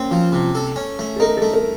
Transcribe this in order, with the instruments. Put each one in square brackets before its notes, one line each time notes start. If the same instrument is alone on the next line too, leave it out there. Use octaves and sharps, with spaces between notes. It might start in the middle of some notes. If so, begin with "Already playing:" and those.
Already playing: [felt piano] A#3 C#4 [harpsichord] C4
[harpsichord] F3
C3
A4
C#4
A3
[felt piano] A4
[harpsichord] D#4 [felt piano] A#4
[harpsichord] A3 [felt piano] A4
[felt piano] A#4